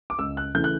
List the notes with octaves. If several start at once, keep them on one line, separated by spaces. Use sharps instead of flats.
D6
C#2 E6
F#6
C#3 E3 A3 G6
F#6